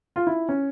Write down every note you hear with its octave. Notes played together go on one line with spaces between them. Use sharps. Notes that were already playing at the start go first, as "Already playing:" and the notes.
F4
E4
C#4